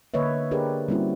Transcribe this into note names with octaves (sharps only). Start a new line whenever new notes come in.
D3 A#3 B4 C#5 D#5 E5
D4 G4 G#4 A#4 B4 D5
G3 A#3 C4 C#4 E4 F#4